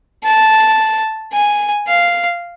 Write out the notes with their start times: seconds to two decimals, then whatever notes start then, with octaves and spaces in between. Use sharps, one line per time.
0.25 A5
1.33 G#5
1.87 F5